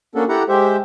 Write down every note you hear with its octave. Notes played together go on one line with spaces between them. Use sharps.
A#3 C#4 D4 F#4 A4
E4 G4 A4 F#5 A#5
G#3 G4 C5 E5